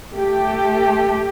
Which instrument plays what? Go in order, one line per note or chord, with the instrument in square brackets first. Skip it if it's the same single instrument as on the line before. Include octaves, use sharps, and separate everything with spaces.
[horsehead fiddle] A3 [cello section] G4